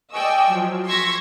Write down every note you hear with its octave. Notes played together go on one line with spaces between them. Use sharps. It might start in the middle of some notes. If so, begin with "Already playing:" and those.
D5 D#5 G5 G#5 C#6 E6
F3 F#3
C6 C#6 E6 G#6 A#6 B6